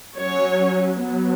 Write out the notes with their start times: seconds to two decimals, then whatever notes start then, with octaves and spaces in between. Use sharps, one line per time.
0.16 F#3 C#4 C#5
1.00 F#3 B3